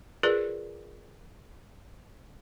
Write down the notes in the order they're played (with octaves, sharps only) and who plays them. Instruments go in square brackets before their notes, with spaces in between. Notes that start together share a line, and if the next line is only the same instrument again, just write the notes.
[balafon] F4 G#4 A#4 B4 D5